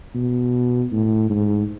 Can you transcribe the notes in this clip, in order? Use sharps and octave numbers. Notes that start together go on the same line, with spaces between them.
B2
A2
G#2